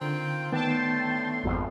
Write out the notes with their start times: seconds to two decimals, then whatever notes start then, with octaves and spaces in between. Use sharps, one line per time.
0.01 D3 D#3 C4 F4 G5
0.52 A2 D3 D#3 A3 B3 D4 G5 A5
0.68 C6
1.44 G#1 F2